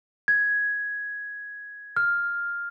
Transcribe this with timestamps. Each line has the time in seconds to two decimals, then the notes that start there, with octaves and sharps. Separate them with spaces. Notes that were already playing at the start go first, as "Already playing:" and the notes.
0.28 G#6
1.96 F6